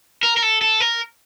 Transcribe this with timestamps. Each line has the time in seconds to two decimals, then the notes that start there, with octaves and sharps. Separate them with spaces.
0.23 A#4
0.37 A#4
0.42 A4
0.61 A4
0.80 A#4